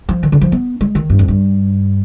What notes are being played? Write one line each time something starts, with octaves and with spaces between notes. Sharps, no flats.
F3
D#3
D3
F3
B3
G#3
D#3
G2
F2
G2